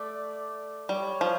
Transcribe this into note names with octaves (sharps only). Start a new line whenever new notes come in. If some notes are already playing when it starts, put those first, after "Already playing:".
Already playing: A3 D5
G3 C#5
F3